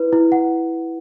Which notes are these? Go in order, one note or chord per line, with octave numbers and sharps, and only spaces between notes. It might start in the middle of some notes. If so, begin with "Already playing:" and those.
Already playing: E4 B4
E4
F#5